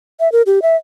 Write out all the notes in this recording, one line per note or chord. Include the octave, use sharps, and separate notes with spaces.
E5
A#4
G4
E5